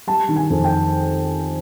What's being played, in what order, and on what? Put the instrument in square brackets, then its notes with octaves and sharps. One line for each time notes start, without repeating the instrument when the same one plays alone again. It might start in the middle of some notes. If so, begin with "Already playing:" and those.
[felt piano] G3 A5
D#3
G#5
F2
G5